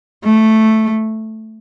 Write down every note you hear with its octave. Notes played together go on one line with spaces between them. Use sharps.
A3